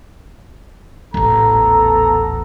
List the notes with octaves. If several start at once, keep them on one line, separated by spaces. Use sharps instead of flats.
D#1 A1 B3 A4 A#5